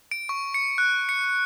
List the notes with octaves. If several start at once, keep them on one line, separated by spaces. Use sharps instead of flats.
D7
C#6
C#7
F#6
C#7